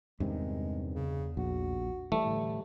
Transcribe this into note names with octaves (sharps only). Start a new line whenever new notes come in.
E2 G2 C3 D#3 G#3
C#3
A#1 F#4
E3 G3 A3
A2 D3